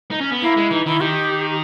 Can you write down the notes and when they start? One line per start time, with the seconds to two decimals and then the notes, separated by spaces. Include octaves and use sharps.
0.11 D#4
0.21 C#4
0.32 B3
0.42 A#3 E4
0.57 G#3
0.70 E3 D#4
0.86 D#3 E4
1.00 D#3 G4